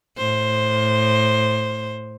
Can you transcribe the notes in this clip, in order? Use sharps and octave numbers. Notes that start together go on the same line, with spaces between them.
A2 C5